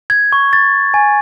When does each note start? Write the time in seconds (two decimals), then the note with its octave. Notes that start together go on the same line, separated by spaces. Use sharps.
0.10 G#6
0.32 C#6
0.53 A6
0.94 G#5